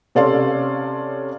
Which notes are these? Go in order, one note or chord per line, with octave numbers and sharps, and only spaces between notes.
C3 C#4 A4 D5 F5 C6